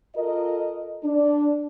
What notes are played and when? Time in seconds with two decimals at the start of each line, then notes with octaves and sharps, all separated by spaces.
0.16 F4 A4 A#4 D#5
1.04 D4